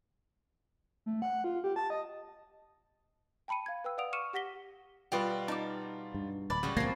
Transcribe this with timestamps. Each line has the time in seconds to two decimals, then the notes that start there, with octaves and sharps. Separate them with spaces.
1.06 A3
1.22 F#5
1.44 F4
1.64 G4
1.76 A5
1.90 D#5
3.48 G5 A5 B5 C#7 D#7
3.66 F5 G#6
3.84 B4 G5 E6
3.98 D5 F5 F#5 D#6 D7 F7
4.13 C#6 D6 F6 C#7 D#7 E7
4.33 G4 F#5 A#6 B6 G7
5.12 B2 G3 B3 F4 G4 B4 D5
5.48 D#4 A5 D6
6.14 G2
6.50 D1 D5 B5 A6
6.63 C#3 G3 F#4
6.77 C#2 A#2 F3 A#3 C4 G#6 A#6 C7